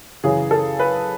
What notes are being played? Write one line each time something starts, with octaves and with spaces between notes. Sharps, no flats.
F#2 C#3 E3 G#4
A4
B4